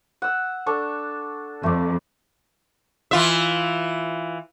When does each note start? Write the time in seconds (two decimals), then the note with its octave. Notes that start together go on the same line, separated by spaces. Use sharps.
0.22 F#5 E6
0.66 D4 A4 C#6
1.63 F2 A3 D5
3.11 E3 F4 E5